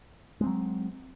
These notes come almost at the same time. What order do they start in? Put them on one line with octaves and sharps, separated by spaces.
G#3 C4 F#3